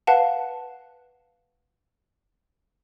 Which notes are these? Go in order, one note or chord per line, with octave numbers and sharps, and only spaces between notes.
B4 F5 F#5 A5